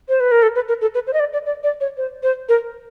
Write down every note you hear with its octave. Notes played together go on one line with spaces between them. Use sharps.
C5
B4
A#4
A4
B4
A#4
A4
B4
C5
D#5
D5
D5
D5
D5
C#5
C5
C5
A#4